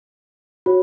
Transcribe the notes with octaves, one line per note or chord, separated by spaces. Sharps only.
F#4 C#5